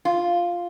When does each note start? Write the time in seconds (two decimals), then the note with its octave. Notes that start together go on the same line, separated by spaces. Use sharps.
0.05 F4